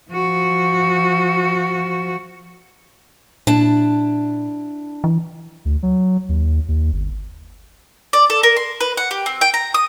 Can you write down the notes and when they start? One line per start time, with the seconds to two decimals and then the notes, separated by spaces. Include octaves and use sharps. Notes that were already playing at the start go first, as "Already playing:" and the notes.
0.11 F3 F#4
3.47 A#2 D4 E4 A5
5.04 E3
5.65 D2
5.83 F#3
6.29 D#2
6.68 D#2
6.93 G1
8.13 D5
8.30 A4
8.43 A#4
8.56 C6
8.81 B4
8.97 F#5
9.11 G4
9.26 C4
9.41 G5
9.54 A#5
9.74 D#6